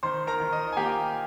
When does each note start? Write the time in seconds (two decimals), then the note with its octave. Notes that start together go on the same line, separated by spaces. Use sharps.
0.03 D#3 C5 C6
0.27 A#4 A#5
0.40 D#3
0.52 D#5
0.73 G#5
0.76 A#3 G4 G5